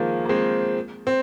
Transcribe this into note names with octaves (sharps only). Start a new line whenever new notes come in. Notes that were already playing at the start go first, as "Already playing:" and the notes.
Already playing: D#3 F3 G#3 A#3
A#3
G#3 C4
C4